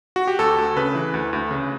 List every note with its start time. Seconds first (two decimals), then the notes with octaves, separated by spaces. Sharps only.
0.16 F#4
0.27 G4
0.39 D2 A4
0.58 D2
0.76 C#3 B4
0.95 E3
1.14 D2
1.33 D2
1.51 C#3